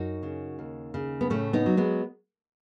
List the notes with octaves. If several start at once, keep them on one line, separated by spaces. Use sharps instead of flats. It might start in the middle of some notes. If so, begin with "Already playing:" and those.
Already playing: F#2 D#4 F#4
C#3
D#2
C#3
B3
A2 A3 C#4
B3 D#4
F#3
G#3 B3